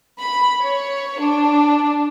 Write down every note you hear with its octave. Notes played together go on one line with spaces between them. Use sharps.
B5
C#5
D4